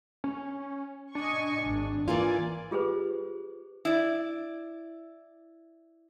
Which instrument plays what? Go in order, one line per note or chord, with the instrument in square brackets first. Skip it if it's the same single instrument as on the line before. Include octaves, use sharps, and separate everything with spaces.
[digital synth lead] C#4
[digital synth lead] D4 [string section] D#5 G#5 C#6
[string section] G#1
[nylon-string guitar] E3 A#3 F4 [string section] D5 [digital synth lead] G#5
[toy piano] F4 G4 G#4 B4 C5
[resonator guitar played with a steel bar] E4 D5